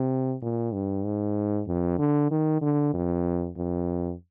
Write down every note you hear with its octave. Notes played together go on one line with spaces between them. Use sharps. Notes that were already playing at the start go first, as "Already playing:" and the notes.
Already playing: C3
A#2
G2
G#2
F2
D3
D#3
D3
F2
F2